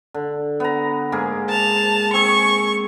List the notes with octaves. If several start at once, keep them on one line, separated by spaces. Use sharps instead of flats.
D3
B3 A#5
G#2 A#3 G#4
A5 F7
C4 G#4 C#6